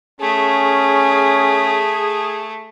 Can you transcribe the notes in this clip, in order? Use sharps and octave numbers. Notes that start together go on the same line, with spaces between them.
A3 C#4 G#4